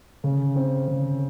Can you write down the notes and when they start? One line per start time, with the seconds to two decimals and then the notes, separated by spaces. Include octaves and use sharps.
0.24 C#3
0.56 C4
0.88 C#3